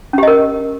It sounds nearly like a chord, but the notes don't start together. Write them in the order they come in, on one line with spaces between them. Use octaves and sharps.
C#4 G4 D#5 A#4